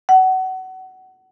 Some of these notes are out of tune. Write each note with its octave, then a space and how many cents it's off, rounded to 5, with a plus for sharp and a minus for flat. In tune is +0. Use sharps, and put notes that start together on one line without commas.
F#5 +25